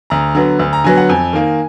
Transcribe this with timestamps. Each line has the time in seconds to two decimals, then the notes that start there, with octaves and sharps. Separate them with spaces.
0.10 D2 A#5
0.35 D3 F#3 B3
0.59 D2
0.73 A#5
0.84 D3 F#3 B3 G#5
0.97 F#5
1.09 F2 G#5
1.33 D#3 A#3